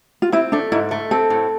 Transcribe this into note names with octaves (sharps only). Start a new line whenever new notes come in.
F4
C4 E4
A3 D4
G#2 E4
A3
C4 A4
A2